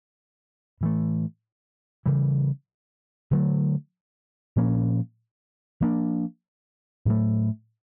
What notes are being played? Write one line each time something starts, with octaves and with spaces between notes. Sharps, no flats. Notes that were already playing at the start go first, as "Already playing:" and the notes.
A2 E3 A3
C#3 E3 G3
D3 F#3 A3
A#2 F3 A#3 C#4
F3 A#3 D4
A2 F#3 A3